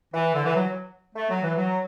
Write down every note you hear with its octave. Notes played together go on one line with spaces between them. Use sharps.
E3
D3
E3
F#3
A3
F#3
E3
F#3